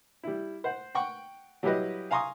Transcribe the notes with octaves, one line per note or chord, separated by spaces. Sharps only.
G3 E4
C5 F#5
F#5 G5 C#6
F#3 G3 E4 G4 B4 D#5
F5 G#5 A#5 C6 C#6 D#6